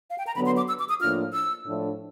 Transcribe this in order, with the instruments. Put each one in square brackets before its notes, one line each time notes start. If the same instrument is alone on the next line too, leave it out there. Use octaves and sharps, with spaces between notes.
[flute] F5
G5
A#5
[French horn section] D3 F#3 B3 [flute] B5
[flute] C6
D6
E6
D6
D#6
[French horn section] A2 F3 A#3 D4 F4 [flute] F6
[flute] E6
[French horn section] A2 F3 A3 D4